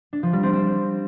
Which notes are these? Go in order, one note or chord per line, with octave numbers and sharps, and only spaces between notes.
D4
F3
G3
C4
C4